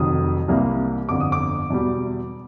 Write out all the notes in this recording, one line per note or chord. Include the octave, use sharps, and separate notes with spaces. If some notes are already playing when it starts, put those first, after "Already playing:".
Already playing: F1 F2 C3 D#3 F#3 D#6
C2 C3 E3 G3 A#3
G1 F2 D3 D6
D#6
D6
E2 B2 G3